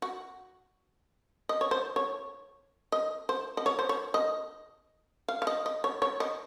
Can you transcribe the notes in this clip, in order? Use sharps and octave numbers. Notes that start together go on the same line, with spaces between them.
F#4
D#5
C#5
C5
C#5
D#5
C5
D#5
C#5
C5
C#5
D#5
F5
F5
D#5
D#5
C#5
C#5
D#5